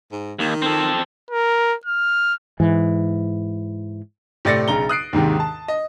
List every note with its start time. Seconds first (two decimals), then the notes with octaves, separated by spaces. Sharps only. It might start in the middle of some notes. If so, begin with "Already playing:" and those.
0.12 G#2
0.39 D#2 D#3
0.62 C4 A4
1.31 A#4
1.85 F6
2.60 G#2 E3
4.45 A2 C3 D5 A6 A#6 C#7
4.68 B1 C#3 A#5 G7
4.89 D#6 F#6 C7 D7
5.13 D#2 G#2 C3 D#3
5.40 A5
5.68 D#5